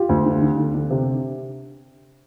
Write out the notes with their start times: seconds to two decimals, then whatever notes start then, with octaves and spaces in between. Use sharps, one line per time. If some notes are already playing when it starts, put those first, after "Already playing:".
Already playing: F4 G4
0.09 D2
0.26 D3
0.42 D3
0.57 D3
0.74 D3
0.90 C3